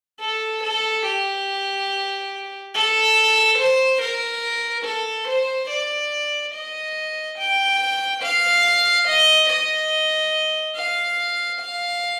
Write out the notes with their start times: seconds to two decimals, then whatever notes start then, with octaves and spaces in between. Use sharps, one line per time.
0.21 A4
0.63 A4
1.05 G4
2.75 A4
3.58 C5
4.02 A#4
4.85 A4
5.28 C5
5.70 D5
6.54 D#5
7.38 G5
8.22 F5
9.07 D#5
9.49 D#5
10.76 F5
11.60 F5